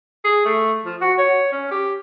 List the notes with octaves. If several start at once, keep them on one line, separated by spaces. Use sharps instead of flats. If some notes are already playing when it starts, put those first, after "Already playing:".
G#4
A3
F3
F#4
C#5
C#4
G4